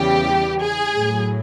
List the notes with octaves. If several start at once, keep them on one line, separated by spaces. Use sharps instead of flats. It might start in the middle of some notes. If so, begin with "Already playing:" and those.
Already playing: E2 C#3 E3 G3 G4
G#4
A2 F#3